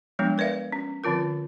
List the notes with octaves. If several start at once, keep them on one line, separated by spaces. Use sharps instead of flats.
F3 G3 G#3 B3 D4
A#4 B4 D5 E5 F5
C#4
D3 F3 C4 F4 A#4